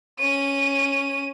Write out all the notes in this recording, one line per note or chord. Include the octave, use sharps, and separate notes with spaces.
C#4 D#7